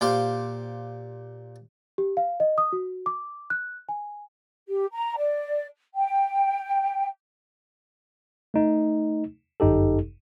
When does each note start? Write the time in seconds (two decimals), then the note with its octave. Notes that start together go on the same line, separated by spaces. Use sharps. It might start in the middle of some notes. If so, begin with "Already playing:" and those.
0.01 A#2 G4 C5 F5
1.98 G4
2.17 F5
2.40 D#5
2.58 D#6
2.73 F#4
3.06 D6
3.50 F#6
3.89 G#5
4.68 G4
4.92 A#5
5.16 D5
5.96 G5
8.54 A3 D#4
9.60 G1 F#2 D#4 G4 A4